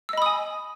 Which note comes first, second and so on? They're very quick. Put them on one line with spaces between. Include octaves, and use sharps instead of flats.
E6 D#5 B5 D#6 G#5